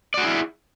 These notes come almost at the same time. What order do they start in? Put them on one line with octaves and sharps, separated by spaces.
D5 F#4 G#4 E4